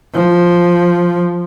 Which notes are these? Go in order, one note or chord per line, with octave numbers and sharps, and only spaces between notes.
F3